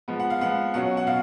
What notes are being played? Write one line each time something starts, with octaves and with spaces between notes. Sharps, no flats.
F3 G#3 B3
F#5
F5
F3 G#3 B3 F#5
B2 F#3 C#4 F#5
F#5
B2 F5